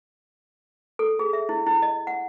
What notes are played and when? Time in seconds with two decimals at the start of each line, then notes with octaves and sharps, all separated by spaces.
0.99 A4
1.19 G#4
1.33 E5
1.49 E4
1.67 E4
1.82 D#5
2.07 F#5